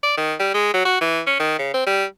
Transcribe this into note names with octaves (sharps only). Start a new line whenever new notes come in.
D5
D#3
G3
G#3
F#3
F#4
E3
C#4
D#3
C#3
C4
G3